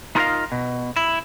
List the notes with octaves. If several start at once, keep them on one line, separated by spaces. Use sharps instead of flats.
D#4 F4 A#4 C5 D#5 F5
B2
E4